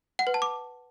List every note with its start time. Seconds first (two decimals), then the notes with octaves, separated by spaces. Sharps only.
0.19 F#5
0.27 B4
0.34 A5
0.42 D6